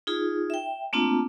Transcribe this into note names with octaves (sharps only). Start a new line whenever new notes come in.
D#4 F4 G#4
E5 G5
A3 A#3 C4 D4 F4 A5